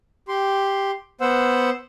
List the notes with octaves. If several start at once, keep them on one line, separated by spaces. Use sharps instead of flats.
G4 C6
B3 C5 F#5 E6